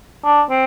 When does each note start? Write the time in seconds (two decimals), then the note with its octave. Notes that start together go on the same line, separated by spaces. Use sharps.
0.25 D4
0.50 C4